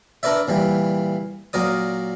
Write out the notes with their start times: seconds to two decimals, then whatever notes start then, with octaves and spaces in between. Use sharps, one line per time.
0.23 D4 A#4 B4 D5 E5
0.48 A#2 E3 G3
1.53 A#2 F#3 A#4 D5 D#6